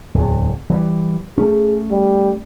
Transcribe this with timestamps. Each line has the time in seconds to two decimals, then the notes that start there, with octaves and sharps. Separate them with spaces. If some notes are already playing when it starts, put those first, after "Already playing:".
0.14 D1 E2
0.70 E3 F#3 G3
1.38 A3 C#4 G#4
1.91 G3